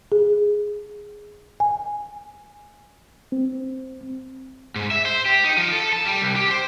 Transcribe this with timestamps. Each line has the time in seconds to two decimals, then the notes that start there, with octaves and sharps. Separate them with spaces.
0.12 G#4
1.60 G#5
3.32 C4
4.76 G#2
4.91 E5
5.05 C5
5.26 G4
5.44 D#4
5.58 F3
5.72 A4
5.93 A5
6.05 G3
6.22 C2
6.36 G4
6.51 C5